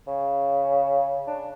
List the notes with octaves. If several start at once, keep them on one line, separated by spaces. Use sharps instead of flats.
C#3
D4